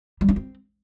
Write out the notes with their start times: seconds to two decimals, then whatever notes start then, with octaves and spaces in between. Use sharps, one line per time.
0.21 G3
0.29 D4
0.36 C4